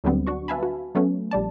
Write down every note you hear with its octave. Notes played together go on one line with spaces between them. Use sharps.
D2 D3 F#3 G3 B3 C4
D4 F#4 C#6
B4 E5 F5 G#5 A5 B5
F#4
F#3 A3 B3 C#4
A#1 G3 D5 A5